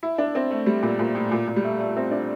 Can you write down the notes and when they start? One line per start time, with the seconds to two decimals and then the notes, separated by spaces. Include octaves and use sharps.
0.03 E4
0.18 D4
0.35 C4
0.51 A3
0.66 G3
0.83 A#2
0.99 A#2
1.15 A2
1.32 A#2
1.48 A#2
1.56 G3
1.64 A3
1.80 A3
1.96 C4
2.11 D4